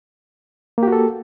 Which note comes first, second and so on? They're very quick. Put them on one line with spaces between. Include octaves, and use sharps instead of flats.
A#3 G4 F#4 A4